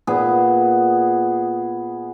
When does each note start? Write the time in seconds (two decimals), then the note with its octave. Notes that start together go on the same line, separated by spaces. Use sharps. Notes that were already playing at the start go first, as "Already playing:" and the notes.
0.07 A#2 B3 G#4